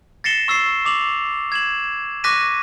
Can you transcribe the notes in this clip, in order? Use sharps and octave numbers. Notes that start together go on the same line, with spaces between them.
A6 A#6 C7 C#7 E7 G7
C#6 E6 A6 C7
D6 F7 F#7
G#6 E7 F#7
C#6 D6 F#6 A#6 B6 D#7